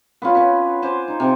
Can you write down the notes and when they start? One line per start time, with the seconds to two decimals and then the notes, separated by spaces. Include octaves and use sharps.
0.22 B3 C#4 F4
0.35 C#4 B4
0.82 C5 G#5 D6
1.08 D#4
1.20 C3